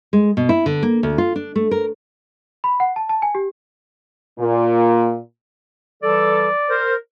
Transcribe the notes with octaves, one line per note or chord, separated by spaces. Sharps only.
G#3
B2
E4
D3
A#3
D2
F4
D4
A3
A#4
B5
F#5
A5
A5
G#5
G4
A#2
E3 G3 A4 D5
A#4 C5